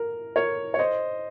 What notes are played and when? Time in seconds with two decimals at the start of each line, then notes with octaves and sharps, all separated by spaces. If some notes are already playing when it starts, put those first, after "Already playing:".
Already playing: A#4
0.36 A#4 C#5
0.74 C#5
0.79 C5 D#5